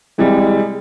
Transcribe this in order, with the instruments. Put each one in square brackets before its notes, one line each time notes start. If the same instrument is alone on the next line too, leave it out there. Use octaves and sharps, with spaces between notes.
[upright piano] C3 E3 G3 [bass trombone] G#3